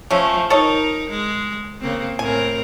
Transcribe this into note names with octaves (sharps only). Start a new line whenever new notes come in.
F3 A3 C#4
D#4 A4 A#4 C#5 D#5
G#3
C#3 A#3 C4
A2 C4 A#4 G#5